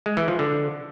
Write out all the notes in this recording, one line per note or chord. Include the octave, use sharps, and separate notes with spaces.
G#3
E3
F3
D3